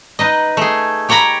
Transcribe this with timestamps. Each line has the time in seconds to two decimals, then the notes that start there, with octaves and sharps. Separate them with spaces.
0.19 D#4 B4 D#5
0.57 A3 G#4
1.09 G4 C#5 G5 A#5 B5